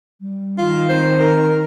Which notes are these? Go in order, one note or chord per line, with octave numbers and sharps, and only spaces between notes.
G3
D#3 F4
C4 C5
A#4